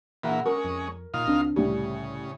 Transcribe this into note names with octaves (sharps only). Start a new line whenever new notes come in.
A#2 E3 G#4 F#5
G#3 C#4 A#4
F2
A#2 D#4 F4 F5
C#2 C4 D4
C2 A2 C#3 G3